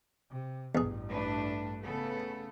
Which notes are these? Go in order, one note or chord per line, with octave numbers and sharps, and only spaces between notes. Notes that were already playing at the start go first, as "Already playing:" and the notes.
C3
A1 E2 G2 G#4
A3 D4 B4
C#3 A3 B3 A4